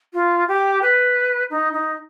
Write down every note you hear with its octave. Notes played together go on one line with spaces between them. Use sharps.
F4
G4
B4
D#4
D#4